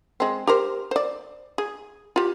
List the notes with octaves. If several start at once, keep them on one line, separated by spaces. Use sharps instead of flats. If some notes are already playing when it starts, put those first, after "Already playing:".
G#3 C4
G4 A#4 C5
C5 D5
G#4
F4 G4